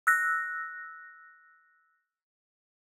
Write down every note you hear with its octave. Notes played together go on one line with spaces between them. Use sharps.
E6 F#6 A#6